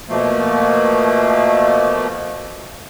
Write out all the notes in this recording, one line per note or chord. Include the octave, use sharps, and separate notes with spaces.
B2 F3 A3 A#3